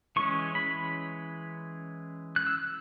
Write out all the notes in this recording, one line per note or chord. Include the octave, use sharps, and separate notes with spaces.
E3 G#3 C#4 C#6
B5
F#6
E6